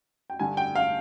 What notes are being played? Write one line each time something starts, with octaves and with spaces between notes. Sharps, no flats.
G5
G2 D3 G3 G#5
G5
F5